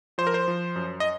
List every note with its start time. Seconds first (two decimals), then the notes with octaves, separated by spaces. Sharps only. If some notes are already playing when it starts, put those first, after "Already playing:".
0.18 F3 C5
0.27 A#4
0.34 C5
0.48 F3
0.76 F#2
1.00 D#5